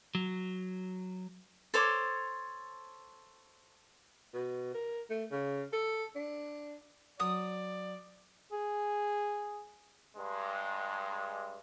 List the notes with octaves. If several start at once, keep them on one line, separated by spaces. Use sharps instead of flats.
F#3
A4 C5 C#5 D6
B2
A#4
A3
C#3
A4
D4
F#3 D5 D#6
G#4
G2 G#3